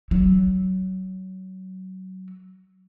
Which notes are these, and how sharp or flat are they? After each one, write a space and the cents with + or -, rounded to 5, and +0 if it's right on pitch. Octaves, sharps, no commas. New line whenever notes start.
F#3 +20